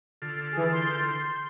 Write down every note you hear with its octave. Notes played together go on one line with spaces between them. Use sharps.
D3 F4 A4
E3 G#4
C6 G6